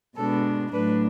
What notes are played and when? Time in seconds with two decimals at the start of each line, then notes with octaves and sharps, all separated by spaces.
0.16 B2 G#3 B3 D4 A4
0.72 A2 F#3 A3 D4 B4